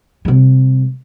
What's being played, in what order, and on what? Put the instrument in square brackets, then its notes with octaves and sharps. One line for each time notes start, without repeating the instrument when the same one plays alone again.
[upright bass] C3 G3